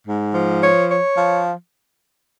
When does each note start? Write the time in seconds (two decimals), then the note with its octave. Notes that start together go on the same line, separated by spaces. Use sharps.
0.07 G#2
0.35 F3
0.63 C#5
0.90 C#5
1.18 F3